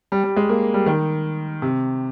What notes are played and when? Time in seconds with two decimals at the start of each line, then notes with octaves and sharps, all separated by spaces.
0.12 G3
0.24 G3
0.37 G#3
0.49 A#3
0.74 G3
0.86 D#3
1.62 C3